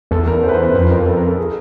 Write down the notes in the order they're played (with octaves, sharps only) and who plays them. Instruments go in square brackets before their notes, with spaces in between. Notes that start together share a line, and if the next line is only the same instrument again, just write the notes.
[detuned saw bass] E2 [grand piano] A4
[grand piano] A#4
C5
B4
C5
B4
[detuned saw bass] F2 [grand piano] B4
[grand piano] A#4
A4
A#4
A4
G#4